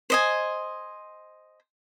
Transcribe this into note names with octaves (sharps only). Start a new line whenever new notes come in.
C5 D#5 G#5